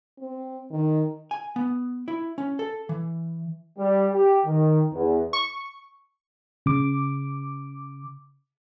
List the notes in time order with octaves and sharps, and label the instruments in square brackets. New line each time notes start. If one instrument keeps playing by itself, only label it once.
[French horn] C4
D#3
[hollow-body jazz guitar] G#5
B3
E4
C#4
A4
E3
[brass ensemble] G3
G4
D#3
E2
[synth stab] C#6
[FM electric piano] C#3 D6